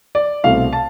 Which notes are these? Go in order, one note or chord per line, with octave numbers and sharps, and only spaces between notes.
D5
C2 B2 A3 C4 F5
A5